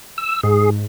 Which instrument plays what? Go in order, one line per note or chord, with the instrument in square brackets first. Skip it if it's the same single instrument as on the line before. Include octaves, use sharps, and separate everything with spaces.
[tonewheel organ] E6
[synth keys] G#2 [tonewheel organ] G#4